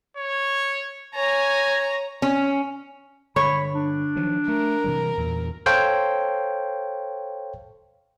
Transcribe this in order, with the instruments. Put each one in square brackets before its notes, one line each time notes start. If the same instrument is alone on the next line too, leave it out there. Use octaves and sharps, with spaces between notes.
[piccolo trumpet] C#5
[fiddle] C#5 A#5 [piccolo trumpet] G#5
[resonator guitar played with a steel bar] C#4
[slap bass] G2 D3 [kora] C#5 [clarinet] B5
[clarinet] D4
[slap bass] D#3 F3 F#3
[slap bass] A3 [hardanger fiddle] A#4
[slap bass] C3 E3 G3
E2 A#2
[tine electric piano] A4 C5 C#5 F5 G5